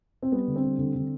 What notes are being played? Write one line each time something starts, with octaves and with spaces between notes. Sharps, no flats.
C4
G3 B3
D3
C4
G3
D3
D3